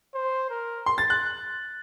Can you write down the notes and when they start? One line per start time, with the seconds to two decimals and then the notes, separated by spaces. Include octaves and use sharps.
0.14 C5
0.50 A#4
0.86 C6
0.98 A6
1.10 F#6